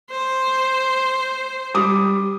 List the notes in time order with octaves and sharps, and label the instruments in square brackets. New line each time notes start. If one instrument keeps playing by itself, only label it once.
[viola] C5
[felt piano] G3 D6 D#6